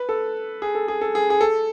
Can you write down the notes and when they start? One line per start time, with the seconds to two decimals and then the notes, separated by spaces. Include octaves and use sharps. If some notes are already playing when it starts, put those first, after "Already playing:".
Already playing: B4
0.09 A4
0.62 G#4
0.75 A4
0.88 G#4
1.01 A4
1.15 G#4
1.30 G#4
1.41 A4